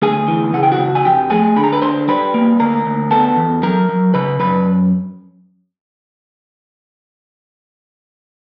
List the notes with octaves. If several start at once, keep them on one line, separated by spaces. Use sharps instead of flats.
D2 G#4 G#5
E3
C#3 F#5
G5
F#4 F#5
C#3
G#5
F2 G4 G5
A3 G#4 G#5
D3 B5
A#5
B4 B5
D3 C5 C6
G3 B4 B5
A#3
D2 A#4 A#5
D2
B3 A4 A5
E2
F#3 A#4 A#5
F#3
C#3 B4 B5
F#2 B4 B5